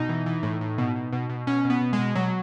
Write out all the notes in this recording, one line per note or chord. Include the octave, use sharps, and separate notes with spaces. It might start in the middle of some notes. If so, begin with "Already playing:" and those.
Already playing: B2 D#4
E3
E3
A2
A2
B2
B2
B2
B2
B2 C#4
B2
B3
B2
G#3
B2
B2 F#3